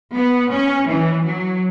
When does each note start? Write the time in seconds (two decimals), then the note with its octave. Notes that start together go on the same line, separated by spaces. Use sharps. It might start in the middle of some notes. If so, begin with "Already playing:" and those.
0.16 B3
0.52 C#4
0.89 E3
1.25 F#3